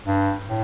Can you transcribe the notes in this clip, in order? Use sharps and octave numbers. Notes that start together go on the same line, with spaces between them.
G2
A2